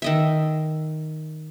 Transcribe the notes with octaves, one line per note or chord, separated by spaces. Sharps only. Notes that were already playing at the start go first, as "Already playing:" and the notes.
D#3 D#5 E5